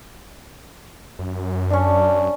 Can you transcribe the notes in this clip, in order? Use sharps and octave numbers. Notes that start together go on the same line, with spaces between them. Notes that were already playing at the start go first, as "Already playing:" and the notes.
F#2
C#4 D4